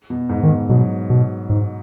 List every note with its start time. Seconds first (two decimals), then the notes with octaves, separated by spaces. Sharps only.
0.10 B2
0.29 G#2
0.43 D#3
0.50 B2
0.69 B2 F#3
1.10 B2
1.50 G#2